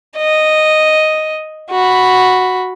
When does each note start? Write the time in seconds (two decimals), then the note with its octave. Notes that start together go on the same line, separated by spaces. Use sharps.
0.17 D#5
1.70 F#4 B5